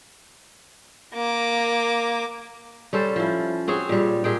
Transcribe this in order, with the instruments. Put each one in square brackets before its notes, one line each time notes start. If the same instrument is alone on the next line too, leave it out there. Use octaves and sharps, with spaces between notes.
[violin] A#3 D6
[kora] G3 C#4 A4 C5
F3 E4
C4 F#4 G#4 C#5
A#2 G3
A#2 G#4 G5